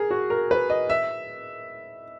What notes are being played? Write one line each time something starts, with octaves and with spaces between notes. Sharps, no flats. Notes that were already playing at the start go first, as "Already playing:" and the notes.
Already playing: G#4 A#4
F#4
A#4
B4
D#5
E5